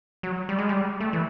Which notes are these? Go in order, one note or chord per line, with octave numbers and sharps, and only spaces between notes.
F#3
G3
G#3
G3
A3
E3